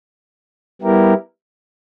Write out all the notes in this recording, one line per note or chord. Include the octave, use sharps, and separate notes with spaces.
G3 B3 E4 G4 A#4